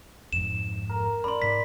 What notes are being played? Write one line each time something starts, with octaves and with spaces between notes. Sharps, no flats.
F2 G#2 E7
A#4
C#4 D5 B5 C6
G#2 B6